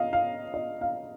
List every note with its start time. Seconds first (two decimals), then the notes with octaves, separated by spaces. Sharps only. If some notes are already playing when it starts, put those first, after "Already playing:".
Already playing: D#5 F5
0.13 F5
0.54 D#5
0.81 F5